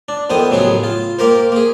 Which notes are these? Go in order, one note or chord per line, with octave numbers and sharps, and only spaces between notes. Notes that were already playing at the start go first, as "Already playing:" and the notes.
D4
F2 D#3 B3 C5 D#6
A1 C#3 F#3 B3 G#4
F4
A#3 G4 A#4 C5
A#3 G#4